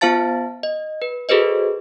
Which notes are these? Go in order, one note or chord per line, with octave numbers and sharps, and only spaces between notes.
B3 F4 C5 F5 A5 A6
D#5
B4
F#4 G#4 A4 B4 C5 D#5